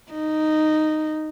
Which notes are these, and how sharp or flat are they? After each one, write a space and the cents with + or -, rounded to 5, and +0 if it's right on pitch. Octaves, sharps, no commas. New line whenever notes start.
D#4 -5